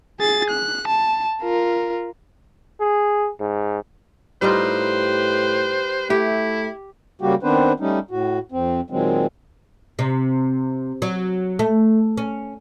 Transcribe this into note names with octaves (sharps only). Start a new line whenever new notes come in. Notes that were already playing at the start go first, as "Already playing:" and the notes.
G#4 A6
F#6
A5
F4 A#4
G#4
G#2
A2 G3 D#4 F4 G4 B4 C5
A3 E4 G4
C#3 G3 A#3 F#4 G4
D#3 B3 C4 D4 B4 C5
G3 A3 C#4 D#4
A2 F#4
F2 C4
A#2 D#3 F#3 G#3 C4
C3
F#3
A3
C#4